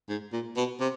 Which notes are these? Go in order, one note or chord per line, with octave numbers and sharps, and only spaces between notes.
G#2
A#2
B2
C3